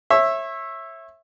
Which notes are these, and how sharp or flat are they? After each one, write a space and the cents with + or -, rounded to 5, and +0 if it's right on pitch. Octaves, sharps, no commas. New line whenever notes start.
C#5 -30 E5 +0